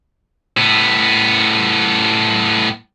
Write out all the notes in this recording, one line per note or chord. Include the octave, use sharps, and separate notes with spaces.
A2 B3